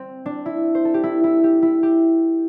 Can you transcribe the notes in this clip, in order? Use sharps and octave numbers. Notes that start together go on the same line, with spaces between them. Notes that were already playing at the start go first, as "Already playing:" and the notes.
Already playing: C4
D4
E4
C5
A4
G4
E4
E4
G4
E4
G4